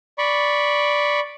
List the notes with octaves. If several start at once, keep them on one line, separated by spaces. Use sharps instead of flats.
D5 B5 C#6